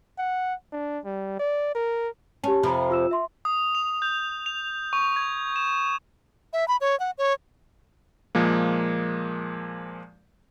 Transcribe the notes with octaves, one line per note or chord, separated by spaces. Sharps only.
F#5
D4
G3
D5
A#4
C#4 G4 C#5 A5
F2 C3 F3 A#5 B5
F4 E6 E7
E5 C6
D#6
F7
G6
F7
C#6
G#6
E7
E5
B5
C#5
F#5
C#5
A#2 F3 G#3 A#3